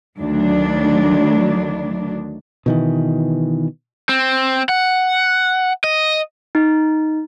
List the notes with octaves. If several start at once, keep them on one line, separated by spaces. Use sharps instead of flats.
D2 D#3 F#3 D4
B2 D#3 E3
C4
F#5
D#5
D#4